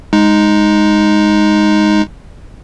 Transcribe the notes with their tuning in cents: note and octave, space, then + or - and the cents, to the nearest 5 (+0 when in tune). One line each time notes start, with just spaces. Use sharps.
G#3 +0 D#4 +0